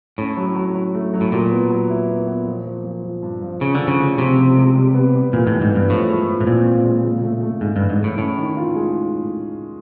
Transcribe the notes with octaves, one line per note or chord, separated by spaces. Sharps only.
A2 C#4
F#3
F#3
F#3
A3
F#3
A2
A#2 F#3
B3
F#3
E4
B3
B3
F3
F3
F3
F3
G2
F3
C#3 C#4
D3
F3
C#3
A2
C3 F3
F3
G#3
G3
B3
G3
A#2 E3
A2
E3
G#2
G2 B3
A2 F3
G#3
F3
A2
A#2 C4
C4
G#3
C#3
A3
A3
G#2 C#3
G2
E3
G#2
A2 C#3
A2 C#4
D#3
F4
G#3